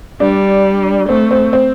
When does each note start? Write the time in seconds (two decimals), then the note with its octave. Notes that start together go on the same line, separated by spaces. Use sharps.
0.20 G3 D4
1.09 A3 C4
1.31 C4
1.53 C4